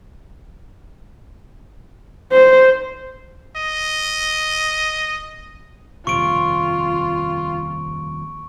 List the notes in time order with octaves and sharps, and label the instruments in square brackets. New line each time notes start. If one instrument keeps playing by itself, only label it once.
[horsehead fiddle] C5
[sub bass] D#1 [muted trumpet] D#5
[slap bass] D#1 F2 C3 [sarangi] F4 [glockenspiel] C#6 D7